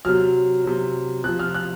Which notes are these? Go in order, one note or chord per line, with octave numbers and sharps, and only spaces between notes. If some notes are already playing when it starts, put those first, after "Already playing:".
C3 F#3 F6
C3 F#3
C3 F3 F#6
F6
F#6